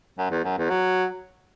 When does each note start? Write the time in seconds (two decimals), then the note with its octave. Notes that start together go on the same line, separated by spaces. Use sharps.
0.18 F#2
0.31 E2
0.44 F#2
0.58 E2
0.70 F#3